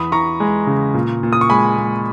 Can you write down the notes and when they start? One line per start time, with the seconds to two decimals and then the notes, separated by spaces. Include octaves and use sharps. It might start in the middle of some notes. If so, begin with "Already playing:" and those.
Already playing: E2 B5 D#6
0.11 E3 A#5 C#6
0.40 G#3
0.67 C#3
0.94 A#2
1.23 A#2
1.33 D#6
1.41 C#6
1.50 G#3 G#5 B5
1.78 G#3